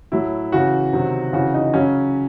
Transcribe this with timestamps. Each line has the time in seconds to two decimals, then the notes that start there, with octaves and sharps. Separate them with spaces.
0.12 A2 F#3 E4
0.52 C#3 E3 F#4
0.93 C3 D#3 F#3
1.33 C#3 E3 F#4
1.54 D#4
1.74 C#3 F#3 C#4